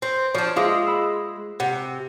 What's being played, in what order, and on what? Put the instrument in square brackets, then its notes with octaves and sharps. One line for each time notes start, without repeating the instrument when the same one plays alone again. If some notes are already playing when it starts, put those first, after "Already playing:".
[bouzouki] C4
[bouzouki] F3 D4 [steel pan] C#5
[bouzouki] G#3 [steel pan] F4 E5 D6
[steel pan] B5 E6
[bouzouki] C3 [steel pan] F#5